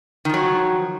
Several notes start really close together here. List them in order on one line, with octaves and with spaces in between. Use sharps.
D#3 F3 F#3